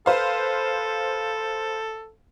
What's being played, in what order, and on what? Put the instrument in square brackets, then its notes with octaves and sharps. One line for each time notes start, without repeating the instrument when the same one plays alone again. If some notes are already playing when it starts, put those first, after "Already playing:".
[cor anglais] A4 [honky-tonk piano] B4 C5 F5